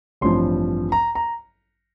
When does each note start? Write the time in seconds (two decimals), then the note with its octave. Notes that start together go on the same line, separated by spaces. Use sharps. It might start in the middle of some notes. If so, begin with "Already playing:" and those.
0.21 A1 G2 F3 C4 C6
0.92 A#5
1.15 A#5